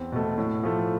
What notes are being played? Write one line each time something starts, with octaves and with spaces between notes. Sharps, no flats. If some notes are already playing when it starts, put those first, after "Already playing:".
Already playing: E2 C4
B2 A3
A2
F3 A3